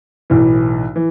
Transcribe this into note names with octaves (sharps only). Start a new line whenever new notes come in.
B1 A2 E3
E3